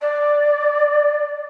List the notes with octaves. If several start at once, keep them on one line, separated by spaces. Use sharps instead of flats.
D5